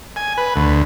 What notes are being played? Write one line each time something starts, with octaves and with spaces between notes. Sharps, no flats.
G#5
B4
D2